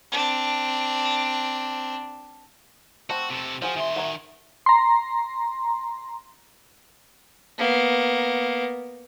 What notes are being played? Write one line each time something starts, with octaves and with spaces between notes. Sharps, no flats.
C4 D4
A3 C4 F#4
C3 A4
F3 F#4 G#4 C5
D#3 E5 C6
F#4 A#4 G#5
A#5 C6
A#3 B3